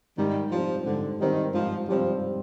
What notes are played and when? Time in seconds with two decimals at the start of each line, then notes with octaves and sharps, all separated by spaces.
0.18 G#2 D#3 G3
0.51 F3 G3 C4
0.86 G#2 D3
1.20 D#3 G3 C4
1.54 G#2 F3
1.89 F3 G3 C4